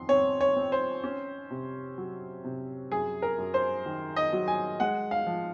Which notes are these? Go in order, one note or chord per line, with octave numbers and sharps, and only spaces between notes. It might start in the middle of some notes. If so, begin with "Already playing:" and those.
Already playing: F2 D#3 C6
C4 C#5
C#5
C4
C5
C#4
C3
F#3
C3
F#2 G#4
A#4
F#2
C5
D#3
D#5
F#3
G#5
G#3 F#5
F5
F3